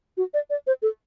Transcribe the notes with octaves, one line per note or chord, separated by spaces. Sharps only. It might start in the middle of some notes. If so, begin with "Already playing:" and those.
F#4
D5
D5
C5
A4